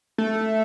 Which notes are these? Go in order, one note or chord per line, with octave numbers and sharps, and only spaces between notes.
A3